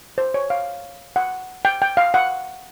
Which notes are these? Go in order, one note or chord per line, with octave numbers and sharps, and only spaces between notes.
C5
C#5
F5
F#5
G5
G5
F5
F#5